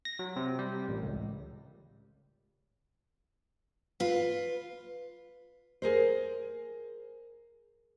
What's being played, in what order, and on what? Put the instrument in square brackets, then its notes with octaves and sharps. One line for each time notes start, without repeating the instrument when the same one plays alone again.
[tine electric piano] A#6
F#3
C3
G3
A1
C#2
[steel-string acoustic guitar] F4 B4
[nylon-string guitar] G#4 A#4 C5